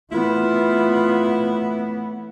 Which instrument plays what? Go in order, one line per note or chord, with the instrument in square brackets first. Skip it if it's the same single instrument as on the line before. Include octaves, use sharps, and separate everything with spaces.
[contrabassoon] A2 [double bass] E3 B3 [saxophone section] E4 [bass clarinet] F4